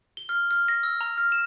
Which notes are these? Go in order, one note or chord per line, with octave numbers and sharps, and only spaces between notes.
G7
F6
F6
A#6
E6
A#5
F6
E7